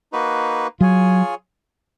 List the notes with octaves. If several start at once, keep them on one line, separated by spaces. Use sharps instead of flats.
A#3 D#4 F#4 B4
F#3 F4 G#4 C#5 G#5